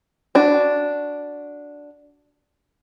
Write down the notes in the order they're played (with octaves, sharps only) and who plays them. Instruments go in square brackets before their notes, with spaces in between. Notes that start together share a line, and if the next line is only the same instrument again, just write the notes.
[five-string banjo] D4 F#4